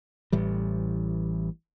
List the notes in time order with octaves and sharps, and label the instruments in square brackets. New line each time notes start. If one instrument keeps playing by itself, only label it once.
[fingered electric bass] A1 A2 E3 G3